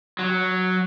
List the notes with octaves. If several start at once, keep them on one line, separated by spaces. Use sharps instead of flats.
F#3